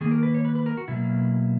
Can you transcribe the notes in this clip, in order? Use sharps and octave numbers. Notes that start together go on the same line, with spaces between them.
D#3 A#3 G#4
A#4
B4
C#5
B4
B4
A#4
F#4
B2 F#3 A#3 E4